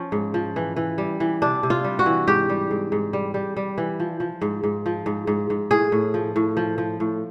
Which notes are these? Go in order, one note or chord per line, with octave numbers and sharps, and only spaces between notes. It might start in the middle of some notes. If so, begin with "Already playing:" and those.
Already playing: F3 C#4
G#2
F3
E3
E3
G3
E3
C3 D4
C3
F4
G3
F#4
E3
G#2 G4
G3
G#2
G#2
G3
G3
G3
E3
F3
F3
G#2
G#2
F3
G#2
G#2
G#2
A2 G#4
A2
F3
A2
F3
F3
A2